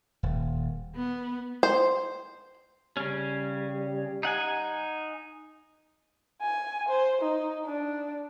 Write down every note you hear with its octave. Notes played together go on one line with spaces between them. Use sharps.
D#1
B3
C5
C#3 G3 C#4
D#4 F#5 G#5
G#5
C5
D#4
D4